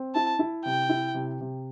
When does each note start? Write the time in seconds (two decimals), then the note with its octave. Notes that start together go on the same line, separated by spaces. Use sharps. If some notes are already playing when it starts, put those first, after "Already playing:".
Already playing: C4
0.15 E4 A5
0.39 E4
0.65 C3 G5
0.89 E4
1.14 C3
1.41 C3